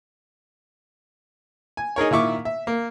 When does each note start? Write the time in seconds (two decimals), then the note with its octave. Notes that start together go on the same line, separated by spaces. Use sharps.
1.77 G#5
1.96 D#4 G#4 A#4 C#5
2.11 A#2 D#3 E4 C#6 D6
2.45 E5
2.67 A#3